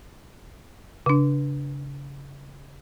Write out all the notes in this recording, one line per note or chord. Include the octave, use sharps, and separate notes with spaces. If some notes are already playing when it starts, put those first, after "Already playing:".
C#3 D4